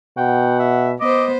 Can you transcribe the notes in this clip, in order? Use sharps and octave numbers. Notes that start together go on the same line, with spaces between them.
B2 F#5 G5
E5
B3 C5 D#5 D6